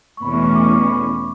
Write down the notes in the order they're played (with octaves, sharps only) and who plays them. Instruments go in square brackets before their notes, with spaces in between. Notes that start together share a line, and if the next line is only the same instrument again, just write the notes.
[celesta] C#6
[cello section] E2 B2 A3 C#4 [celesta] B5
[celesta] C#6
C#6
D6
C#6
B5